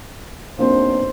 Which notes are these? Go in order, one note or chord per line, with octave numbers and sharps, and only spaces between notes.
B1 A#3 C4 D4 C5